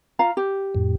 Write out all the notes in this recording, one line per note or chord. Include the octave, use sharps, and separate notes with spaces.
F4 F5 A#5
G4
F2 A2